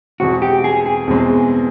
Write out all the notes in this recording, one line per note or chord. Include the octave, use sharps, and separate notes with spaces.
E2 B2 G#3 C4 F#4
G4
G#4
G#4
E2 B2 G#3 C4